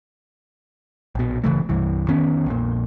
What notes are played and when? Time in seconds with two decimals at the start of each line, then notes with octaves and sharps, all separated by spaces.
1.15 A#1 B2
1.44 G1 C#3 E3 A3
1.69 C2 G2 E3
2.08 F2 D#3 B3 C#4
2.46 A#1 F2 A#2